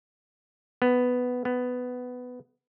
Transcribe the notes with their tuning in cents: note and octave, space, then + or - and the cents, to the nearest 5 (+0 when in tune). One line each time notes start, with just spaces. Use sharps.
B3 +5
B3 +10